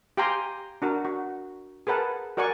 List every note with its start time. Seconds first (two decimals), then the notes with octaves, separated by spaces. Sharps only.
0.17 G4 F5 G5 G#5 A#5 C6
0.82 D4 F#4 A#4
1.05 F#4
1.87 G#4 A#4 B4 F#5 A5
2.37 F#4 A#4 D5 F#5 G#5 C#6